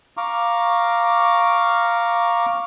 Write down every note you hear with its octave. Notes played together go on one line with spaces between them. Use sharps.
F5 A#5 C#6 D6